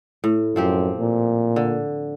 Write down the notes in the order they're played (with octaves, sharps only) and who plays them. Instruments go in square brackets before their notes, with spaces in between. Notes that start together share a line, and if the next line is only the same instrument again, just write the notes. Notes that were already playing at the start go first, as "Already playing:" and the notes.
[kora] A2
[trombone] F#2 [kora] F3 C4 G4
[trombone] A#2
[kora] D3